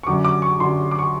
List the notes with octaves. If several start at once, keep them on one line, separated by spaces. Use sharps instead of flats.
C#6
F#2 D3 F#3 D6
D6
C#6
F#2 D3 F#3 C6
D6
C#6